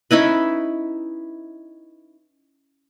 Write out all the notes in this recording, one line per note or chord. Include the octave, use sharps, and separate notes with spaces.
C#4 D#4 E4 B4